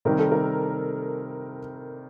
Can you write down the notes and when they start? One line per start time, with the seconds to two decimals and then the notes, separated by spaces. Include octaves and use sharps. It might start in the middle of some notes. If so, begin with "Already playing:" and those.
0.05 C3 D#3 G3 A#4
0.19 A4
0.31 A#4